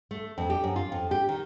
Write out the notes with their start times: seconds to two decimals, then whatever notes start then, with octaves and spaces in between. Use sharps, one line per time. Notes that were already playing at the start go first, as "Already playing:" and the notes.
0.11 A3
0.38 F2
0.50 G4
0.64 F#2
0.76 F4
0.92 F2
1.11 G4
1.29 D#3